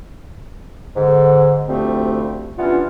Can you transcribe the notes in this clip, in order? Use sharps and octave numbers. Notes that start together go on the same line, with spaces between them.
G#2 D3
D2 F3 G3 A3 C4
E3 G3 B3 C#4 D4 F4